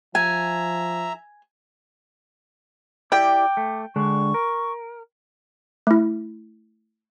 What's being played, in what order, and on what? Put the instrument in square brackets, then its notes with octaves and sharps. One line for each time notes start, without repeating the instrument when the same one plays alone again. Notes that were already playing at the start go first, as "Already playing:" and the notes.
[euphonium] F3 [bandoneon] E5 A#5 [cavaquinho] G#5
[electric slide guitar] E4 G4 D5 [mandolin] G5 [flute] D6
[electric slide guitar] A3
[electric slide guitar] D3 G#3 D4 [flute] C#6
[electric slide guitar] A#4
[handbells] A3 E4